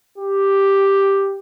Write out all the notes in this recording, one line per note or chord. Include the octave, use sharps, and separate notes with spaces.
G4